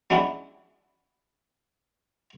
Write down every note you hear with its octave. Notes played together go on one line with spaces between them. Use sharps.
F#3 G#3 C#4 D4 E4 G4